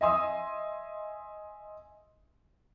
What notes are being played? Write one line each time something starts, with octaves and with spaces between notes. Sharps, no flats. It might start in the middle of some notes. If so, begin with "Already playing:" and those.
D#5 E5 G#5 C6 D#6 E6